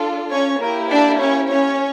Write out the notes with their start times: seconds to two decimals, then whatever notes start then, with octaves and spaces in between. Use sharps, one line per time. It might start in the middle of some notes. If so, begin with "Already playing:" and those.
Already playing: D4 F4 A4
0.31 C#4 C#5
0.60 A#3 E4 G4 A#4
0.90 D4 D5
1.20 C#4 C#5
1.49 C#4 C#5